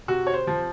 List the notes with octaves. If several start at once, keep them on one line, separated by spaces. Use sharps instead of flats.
C3 F#4
C#5
C5
F3